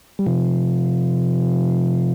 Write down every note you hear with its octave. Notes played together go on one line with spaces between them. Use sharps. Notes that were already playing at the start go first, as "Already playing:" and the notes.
G3
C3 F3